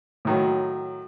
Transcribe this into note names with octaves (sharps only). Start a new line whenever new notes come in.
A2 D#3 F#3